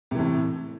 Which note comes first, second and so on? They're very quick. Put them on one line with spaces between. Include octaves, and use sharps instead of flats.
C3 E3 A2